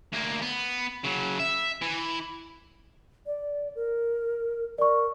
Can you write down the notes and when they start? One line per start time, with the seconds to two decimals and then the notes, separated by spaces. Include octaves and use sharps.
0.13 D2 A#3
0.42 B3
1.04 C#3 F#3
1.39 E5
1.82 E3
3.26 D5
3.76 A#4
4.78 A#4 D5 C#6